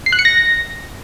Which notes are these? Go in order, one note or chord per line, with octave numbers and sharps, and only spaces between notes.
C7
F#6
C#7
A#6